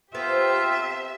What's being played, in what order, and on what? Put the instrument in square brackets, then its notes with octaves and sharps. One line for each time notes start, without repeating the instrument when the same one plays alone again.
[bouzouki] B3 C4 A4 [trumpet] F4 [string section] G4 C5 [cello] E5